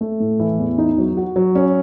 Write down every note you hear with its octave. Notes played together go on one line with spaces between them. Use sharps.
A3
A2
E3
E2
D#4
F#3
F#4
F#3
C#4